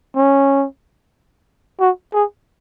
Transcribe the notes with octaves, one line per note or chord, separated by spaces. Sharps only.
C#4
F#4
G#4